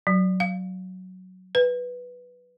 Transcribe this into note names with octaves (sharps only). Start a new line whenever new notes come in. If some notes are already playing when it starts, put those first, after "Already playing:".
F#3
F5
B4